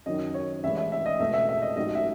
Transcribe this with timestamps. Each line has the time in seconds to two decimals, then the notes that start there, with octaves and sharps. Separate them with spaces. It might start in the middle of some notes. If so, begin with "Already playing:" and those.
0.06 F#2 D#3 F#3 D#5
0.34 C#5
0.63 A1 A2 E3 G#3 E5
0.77 E5
0.92 E5
1.06 D#5
1.19 C#2 B2 A3 E5
1.33 E5
1.49 E5
1.62 D#5
1.76 A1 G#2 F#3 A3 D#5
1.95 E5